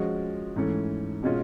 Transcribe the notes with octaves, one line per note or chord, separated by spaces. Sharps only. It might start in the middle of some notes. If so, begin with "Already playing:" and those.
Already playing: F3 G#3 C#4 F#4
G#2 E3 A3 C#4
B2 G#3 C#4 F4